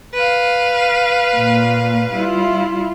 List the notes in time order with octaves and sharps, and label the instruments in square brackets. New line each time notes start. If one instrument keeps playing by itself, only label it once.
[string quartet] B4 F5
[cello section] A#2 A#3
G3 E4 F4